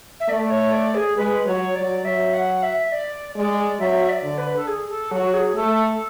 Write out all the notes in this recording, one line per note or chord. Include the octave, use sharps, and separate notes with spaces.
E5
A3 D5
D5
C#5
D5
G#4
G#3 B4
F#3 C#5
F#3 D5
F#3 E5
F#5
E5
D5
G#3 D5
F#3 E5
D5
D3
B4
A4
G#4
A4
F#3 F#4
G#4
A3 A4